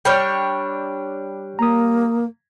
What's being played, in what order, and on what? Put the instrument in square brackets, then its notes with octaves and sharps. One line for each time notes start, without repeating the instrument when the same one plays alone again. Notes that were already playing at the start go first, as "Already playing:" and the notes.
[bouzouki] G3 D4 C#5 [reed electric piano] G5 F6 G6
[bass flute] A#3 [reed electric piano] A#5 D#6